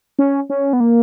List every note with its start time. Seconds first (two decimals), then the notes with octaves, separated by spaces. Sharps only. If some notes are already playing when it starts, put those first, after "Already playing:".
0.19 C#4
0.50 C#4
0.73 B3
0.80 A#3